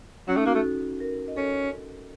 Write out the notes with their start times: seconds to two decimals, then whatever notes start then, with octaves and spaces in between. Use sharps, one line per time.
0.28 F#3 C#4
0.37 A3 D#4
0.46 A#3 F#4
0.55 A3 A4
1.00 A#4
1.28 D#5
1.36 C#4 A4